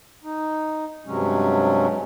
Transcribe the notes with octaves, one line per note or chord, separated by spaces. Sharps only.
D#4
G2 C3 F#3 G#3 C#4